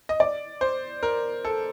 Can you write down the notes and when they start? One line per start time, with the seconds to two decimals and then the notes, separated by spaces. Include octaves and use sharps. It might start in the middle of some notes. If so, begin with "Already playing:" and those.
0.09 D#5
0.20 D5
0.61 C5
1.03 A#4
1.45 A4